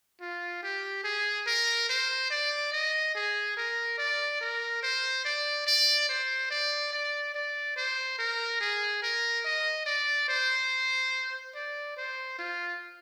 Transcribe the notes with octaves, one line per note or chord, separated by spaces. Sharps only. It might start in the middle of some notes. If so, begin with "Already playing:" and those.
F4
G4
G#4
A#4
C5
D5
D#5
G#4
A#4
D5
A#4
C5
D5
D5
C5
D5
D5
D5
C5
A#4
G#4
A#4
D#5
D5
C5
D5
C5
F4